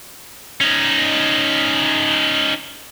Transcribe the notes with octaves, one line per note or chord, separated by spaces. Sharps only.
C#4 D#4